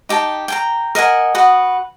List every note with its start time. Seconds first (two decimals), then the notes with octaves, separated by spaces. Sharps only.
0.09 D#4 G4 G5 A5
0.48 G5 G#5 A#5
0.95 A#4 D#5 F#5 G#5
1.35 F#4 B4 F#5 D#6